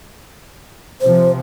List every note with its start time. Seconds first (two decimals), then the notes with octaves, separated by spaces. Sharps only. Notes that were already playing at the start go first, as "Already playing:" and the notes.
1.01 C3 F3 C5